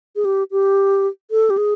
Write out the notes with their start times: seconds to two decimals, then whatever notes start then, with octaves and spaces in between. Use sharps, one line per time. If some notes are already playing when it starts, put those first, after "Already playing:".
0.16 G#4
0.25 G4
0.51 G4
1.31 A4
1.50 G4
1.57 G#4